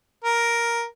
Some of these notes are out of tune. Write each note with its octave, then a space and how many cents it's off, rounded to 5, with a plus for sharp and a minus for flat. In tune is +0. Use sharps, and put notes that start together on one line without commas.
A#4 +5